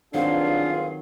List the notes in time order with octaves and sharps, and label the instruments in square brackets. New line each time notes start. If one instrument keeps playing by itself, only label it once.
[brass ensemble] G1 F4 G#4 [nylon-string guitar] D#3 F#3 C4 [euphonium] D4 [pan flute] F5